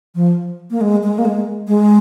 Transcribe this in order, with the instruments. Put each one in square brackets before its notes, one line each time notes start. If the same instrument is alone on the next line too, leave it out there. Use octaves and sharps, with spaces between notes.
[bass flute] F3
A#3
G#3
G#3
A#3
G#3
G#3